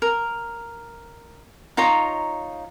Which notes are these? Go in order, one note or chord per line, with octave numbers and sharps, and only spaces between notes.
A#4
D#4 F4 C#5 A#5